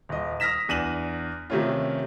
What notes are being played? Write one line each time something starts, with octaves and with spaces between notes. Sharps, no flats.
D#1 D#5
D#6 F6 A#6 B6 E7
E2 D4 D#7 E7 F#7
C3 D#3 A3 C#4 F4